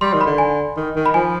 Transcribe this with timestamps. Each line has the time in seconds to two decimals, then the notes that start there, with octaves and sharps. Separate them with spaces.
0.01 G3 C6
0.13 D#3
0.21 B5
0.27 D3
0.38 G#5
0.77 D#3
0.96 D#3
1.06 B5
1.14 F3 G#5